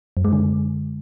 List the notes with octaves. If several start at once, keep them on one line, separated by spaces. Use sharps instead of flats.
F#2
G#3
D3